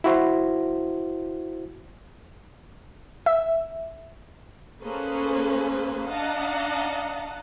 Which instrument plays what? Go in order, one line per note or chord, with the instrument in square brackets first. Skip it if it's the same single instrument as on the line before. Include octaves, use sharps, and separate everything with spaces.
[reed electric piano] E4 F#4 C5
[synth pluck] E5
[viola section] A#3 C#4 G#4 A4 B4 C5
D4 D#5 F5 F#5 A5 A#5